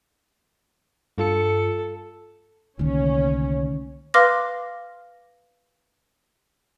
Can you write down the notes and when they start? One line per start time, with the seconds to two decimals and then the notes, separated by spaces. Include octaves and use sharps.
1.18 G2 F4 A4 C#7
2.79 C2 D3 D#3 A3 A#3 C#4
4.14 B4 F5 C6 D6 F6 A#6